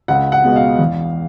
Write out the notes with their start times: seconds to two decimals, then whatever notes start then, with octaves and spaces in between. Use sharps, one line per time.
0.08 C#2 F#5
0.32 F#5
0.44 B2 G#3 B3
0.56 F5
0.79 E2